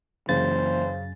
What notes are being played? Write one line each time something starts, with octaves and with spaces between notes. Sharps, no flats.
F#2 C#3 E3 A#3 C5 A6